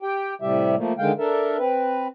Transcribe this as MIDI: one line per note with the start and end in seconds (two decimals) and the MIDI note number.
0.02 0.34 67
0.02 0.34 79
0.42 0.75 45
0.42 0.75 48
0.42 0.75 55
0.42 0.75 67
0.42 0.75 76
0.76 0.93 53
0.76 0.93 57
0.76 0.93 58
0.99 1.12 50
0.99 1.12 51
0.99 1.12 56
0.99 1.12 77
0.99 1.12 79
1.19 1.57 62
1.19 1.57 69
1.19 1.57 70
1.19 1.57 76
1.58 2.08 60
1.58 2.08 71